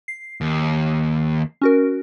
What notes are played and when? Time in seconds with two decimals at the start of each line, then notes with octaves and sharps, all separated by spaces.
0.08 C7
0.41 D#2
1.61 C#4 F#4 A#4